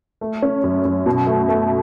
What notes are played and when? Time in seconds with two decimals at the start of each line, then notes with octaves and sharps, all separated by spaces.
0.21 A3
0.42 C#4
0.64 F#2
0.85 F#2
1.06 B2
1.27 A3
1.49 A3